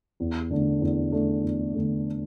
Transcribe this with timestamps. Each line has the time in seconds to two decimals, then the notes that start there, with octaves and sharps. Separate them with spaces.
0.20 E2
0.50 D3 A3 D4
0.82 E2
1.12 D3 A3 D4
1.43 E2
1.74 D3 A3 D4